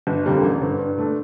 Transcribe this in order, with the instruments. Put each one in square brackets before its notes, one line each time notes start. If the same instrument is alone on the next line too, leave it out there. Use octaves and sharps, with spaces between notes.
[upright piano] G1
F2 D3 G3 A#3
A1
G2 D3
G2
D3 A3 D4